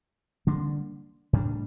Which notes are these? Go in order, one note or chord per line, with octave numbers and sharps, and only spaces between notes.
D3 G3 A#3 D4
A2 G3 D4